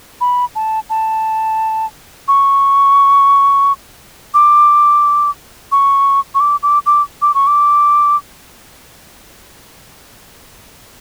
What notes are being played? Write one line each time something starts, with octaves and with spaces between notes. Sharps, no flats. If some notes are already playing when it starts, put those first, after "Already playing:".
B5
A5
A5
C#6
D6
C#6
C#6
D6
D6
D6
D6
C#6
D6